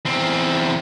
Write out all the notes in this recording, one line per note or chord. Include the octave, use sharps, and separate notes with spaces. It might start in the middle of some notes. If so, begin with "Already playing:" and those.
E2 C4